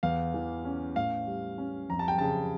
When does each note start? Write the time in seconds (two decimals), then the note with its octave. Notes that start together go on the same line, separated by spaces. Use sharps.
0.03 E2 F5
0.34 E3
0.65 C#4
0.96 A2 F5
1.27 G3
1.58 C#4
1.90 F2 A#5
1.99 A5
2.08 G5
2.18 C#3 A5